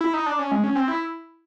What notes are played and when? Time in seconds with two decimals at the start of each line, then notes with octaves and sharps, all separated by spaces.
0.01 E4
0.14 D#4
0.26 D4
0.39 C#4
0.51 G#3
0.64 C#4
0.75 C4
0.88 E4